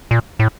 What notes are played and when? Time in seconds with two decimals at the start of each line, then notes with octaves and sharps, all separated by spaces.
0.11 A#2
0.39 A2